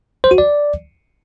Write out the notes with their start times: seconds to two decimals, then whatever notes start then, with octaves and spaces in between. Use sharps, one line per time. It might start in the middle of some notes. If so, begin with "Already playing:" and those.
0.24 C5
0.31 F#4
0.38 D5